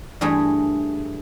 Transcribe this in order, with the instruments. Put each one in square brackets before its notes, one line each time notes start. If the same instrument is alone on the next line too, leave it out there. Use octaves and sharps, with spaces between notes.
[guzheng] G2 E3 A3 G#4